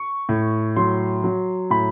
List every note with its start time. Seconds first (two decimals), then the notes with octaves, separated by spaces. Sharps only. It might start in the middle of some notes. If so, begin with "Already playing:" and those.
Already playing: C#6
0.29 A2
0.76 F#3 C6
1.24 F#3
1.70 A2 B5